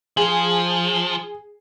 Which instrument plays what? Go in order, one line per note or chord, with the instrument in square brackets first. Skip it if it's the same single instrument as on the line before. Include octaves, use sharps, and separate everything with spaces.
[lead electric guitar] F3 [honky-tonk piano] G#4